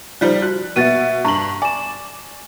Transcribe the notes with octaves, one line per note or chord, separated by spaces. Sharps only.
F3 G3 D#4 C5 D5
F#4 F#6
B2 B3 F#4 E5 A6 D#7
G2 A#5 C#6 F#7
D5 G#5 E7